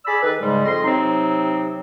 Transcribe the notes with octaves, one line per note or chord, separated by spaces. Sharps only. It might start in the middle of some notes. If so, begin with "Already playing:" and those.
G#4 D5 B5 E6
D#3 A4 B4
G#2 C#3 G3 G#3
F2 D#5 C6
C3 F#3 C4 D#4